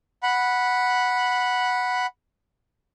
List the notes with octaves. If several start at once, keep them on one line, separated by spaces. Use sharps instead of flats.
F#5 B5